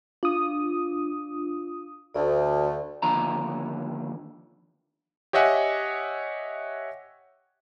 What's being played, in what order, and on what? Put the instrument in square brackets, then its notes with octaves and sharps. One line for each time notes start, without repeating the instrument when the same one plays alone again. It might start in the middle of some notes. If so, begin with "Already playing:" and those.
[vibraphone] D4 [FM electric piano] F4 D#6
[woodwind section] D2 [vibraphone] D5
[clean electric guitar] D#2 D3 F3 A#5
[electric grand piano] G4 C#5 D#5 E5 F#5 G#5